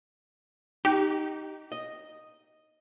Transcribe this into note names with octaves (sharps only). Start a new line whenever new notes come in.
D#4 G4
D#5